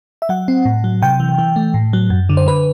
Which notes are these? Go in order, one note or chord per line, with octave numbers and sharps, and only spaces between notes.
E5
F#3 F#5
C4
A2
F#3
C3 G5
E3
E3
A3
A2
F#3
F#2
D3
C5
D3 B4